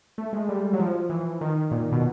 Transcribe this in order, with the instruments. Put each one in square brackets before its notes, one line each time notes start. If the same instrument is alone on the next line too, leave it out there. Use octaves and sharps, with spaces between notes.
[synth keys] A3
G#3
G3
F#3
F3
E3
D#3
A#2
B2